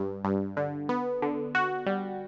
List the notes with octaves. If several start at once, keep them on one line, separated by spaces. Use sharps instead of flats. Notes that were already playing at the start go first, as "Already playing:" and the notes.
Already playing: G2
G2
D3
B3
D3
F#4
G3